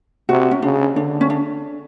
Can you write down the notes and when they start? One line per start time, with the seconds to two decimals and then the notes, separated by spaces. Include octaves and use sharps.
0.29 C3 F#4
0.51 C#4
0.62 C#3 D4
0.95 D3 D4
1.21 C#4
1.30 D4